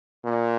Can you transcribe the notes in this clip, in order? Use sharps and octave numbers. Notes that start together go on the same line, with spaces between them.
A#2